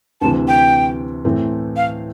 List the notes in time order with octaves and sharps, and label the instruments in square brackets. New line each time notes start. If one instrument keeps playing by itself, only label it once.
[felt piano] D2 C3 E3 [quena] A5
[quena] G5
[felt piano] A2 E3 A3 C4
[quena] F5